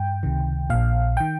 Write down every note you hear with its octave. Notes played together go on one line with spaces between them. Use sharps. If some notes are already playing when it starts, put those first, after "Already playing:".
Already playing: G2 G5
C#2 C3 D#3
A#1 A#2 F5
D#3 G5